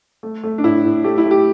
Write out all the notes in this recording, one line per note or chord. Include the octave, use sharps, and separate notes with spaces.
A3
A3
D4
A2 E4
A2
A3 G4
E4
A3
G4